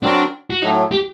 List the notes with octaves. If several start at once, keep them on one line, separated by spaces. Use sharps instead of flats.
D3 F#3 C4 D4 F#4 A#4
F#4
A2 F#3 A3 D#4
G4